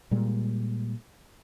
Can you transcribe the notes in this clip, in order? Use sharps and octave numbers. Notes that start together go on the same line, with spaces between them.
A#2 G3 G#3